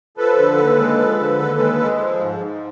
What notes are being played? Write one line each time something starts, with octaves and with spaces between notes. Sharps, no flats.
F3 A4 B4
D3
D#2
G#3
F3
D3
D#2
G#3
G#3
F3
G#2
G#2